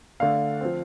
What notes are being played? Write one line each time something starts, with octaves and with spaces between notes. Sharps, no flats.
D3 A3 D4 F5
F3 C4